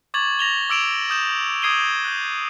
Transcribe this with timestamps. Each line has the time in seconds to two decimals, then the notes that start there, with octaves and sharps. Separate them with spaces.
0.14 C#6 D6 G#6 A6 F#7
0.39 A6 A#6 F7 G7
0.70 D6 E6 D7 E7 F7
1.10 D#6 G6 E7
1.62 D#6 G#6 C7 D#7 G7
2.05 F#6 G6